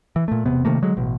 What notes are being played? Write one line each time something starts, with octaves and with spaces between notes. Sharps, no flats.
E3
A#2 A3
E1 C3 B3
C3 D#3 A3 A#3
D3 F#3 G#3
A1 B2